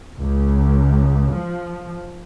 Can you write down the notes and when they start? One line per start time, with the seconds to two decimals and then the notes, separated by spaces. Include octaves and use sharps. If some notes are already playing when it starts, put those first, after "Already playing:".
0.19 C#2
1.33 F3